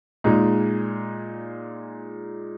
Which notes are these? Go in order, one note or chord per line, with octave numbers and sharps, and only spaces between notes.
A#2 G#3 D#4 G#4